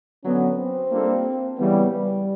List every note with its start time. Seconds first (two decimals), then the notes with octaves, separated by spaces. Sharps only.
0.24 D3 F#3 B3 C#4
0.58 C4
0.91 G3 A#3 D4 F4 A4
1.57 C#3 E3 G3 B3
1.91 G3